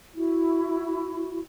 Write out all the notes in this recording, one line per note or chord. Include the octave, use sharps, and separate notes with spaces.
E4 F#4